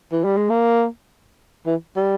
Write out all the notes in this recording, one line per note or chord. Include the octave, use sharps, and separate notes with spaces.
E3
G3
G#3
A#3
E3
G3